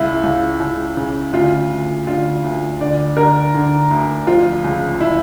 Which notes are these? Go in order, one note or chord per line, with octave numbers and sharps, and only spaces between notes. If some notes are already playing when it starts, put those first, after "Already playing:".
Already playing: C#2 E4
C#2
C#2
C#3
D2 F4
D2
D3 F4
D2
D3 D5
D3 A#4
D3
D2
F3 F4
C#2
E4